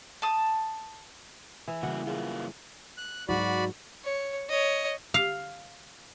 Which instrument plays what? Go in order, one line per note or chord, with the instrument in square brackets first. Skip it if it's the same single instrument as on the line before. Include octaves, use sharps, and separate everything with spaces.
[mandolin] A5 D#6
[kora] E3 [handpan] B4
[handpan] C#3 E3 G3 [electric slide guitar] A#3 F#4 [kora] F#5
[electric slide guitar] F#2 A#3 F4 [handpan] G#4
[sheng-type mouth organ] F#6
[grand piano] G#2 F#3 [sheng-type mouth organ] F#4 D5 B5
[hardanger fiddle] C#5
C#5 D#5
[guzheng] F5